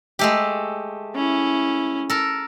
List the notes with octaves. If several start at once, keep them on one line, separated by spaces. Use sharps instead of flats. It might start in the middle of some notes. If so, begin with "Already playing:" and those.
G#3 A3 G4
C#4 E4
A4 A#4